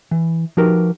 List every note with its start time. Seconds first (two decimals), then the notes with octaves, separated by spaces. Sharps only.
0.11 E3
0.57 F3 D#4 F#4 G4 A#4 B4